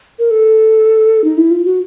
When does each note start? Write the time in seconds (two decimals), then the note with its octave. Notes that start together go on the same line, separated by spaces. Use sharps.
0.19 A#4
0.31 A4
1.24 D#4
1.37 E4
1.51 F4
1.65 F#4